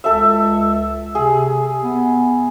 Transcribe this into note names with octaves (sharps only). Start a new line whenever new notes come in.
C#2 A4 E5
C3 G#4
B3